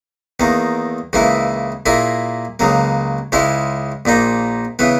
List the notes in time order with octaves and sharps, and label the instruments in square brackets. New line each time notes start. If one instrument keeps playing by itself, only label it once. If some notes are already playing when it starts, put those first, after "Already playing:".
[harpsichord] E2 D#3 A#3
C#2 C#3 E3 A#3 E4
A#2 A#3 E4 G#4
C#2 C#3 F#3 A#3
C#2 C#3 G#3 C#4 E4
A#1 A#2 A#3 D#4
C#3 E3 B3